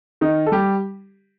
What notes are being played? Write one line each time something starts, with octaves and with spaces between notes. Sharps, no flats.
D#3 D#4
A4
G3 G4